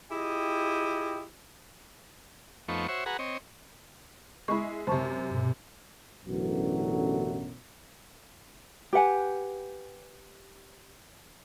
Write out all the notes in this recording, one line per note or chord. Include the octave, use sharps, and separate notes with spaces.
E4 F4 G4 G#4 D#5 G5
F2 F3 A3 B3 D#4 C#6
F#4 C5 C#5 E5
F#4 G#4 B4 F#5 A#5
C4 C#5 D#5
G#3 E4 B5 C#6
F#2 C3 C5 A5 C#6
G2 B2
A1 F#2 B2 D3 E3 F#3
G4 B4 F#5 G#5